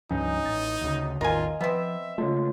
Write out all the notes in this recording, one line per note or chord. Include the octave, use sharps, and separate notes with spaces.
C#2 G2 F3 C#4 D#4
A1 A6
D2 C#3
A1 E2 D#3 F4 A#4 D#5 G#5
F3 B3 C4 E5
C#3 G#3 A3 F4 C#5